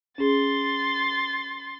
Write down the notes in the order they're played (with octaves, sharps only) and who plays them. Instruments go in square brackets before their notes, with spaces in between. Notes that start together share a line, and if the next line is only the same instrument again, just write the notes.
[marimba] C#4 G#4 [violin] C6 A6